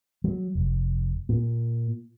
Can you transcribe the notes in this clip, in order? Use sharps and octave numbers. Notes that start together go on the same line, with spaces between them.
F#3
F1
A#2